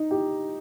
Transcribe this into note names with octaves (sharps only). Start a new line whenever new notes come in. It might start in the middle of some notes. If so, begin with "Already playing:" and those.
Already playing: D#4
G4